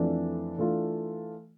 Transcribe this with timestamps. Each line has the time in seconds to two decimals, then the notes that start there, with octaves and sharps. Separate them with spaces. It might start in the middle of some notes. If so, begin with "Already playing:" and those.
Already playing: F2 E3 A3 D4 F4
0.58 E3 A3 D4 F4